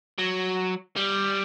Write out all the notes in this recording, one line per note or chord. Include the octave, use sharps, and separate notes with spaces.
F#3
G3